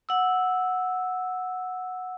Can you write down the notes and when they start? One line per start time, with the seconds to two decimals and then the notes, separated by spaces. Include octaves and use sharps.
0.09 F#5 E6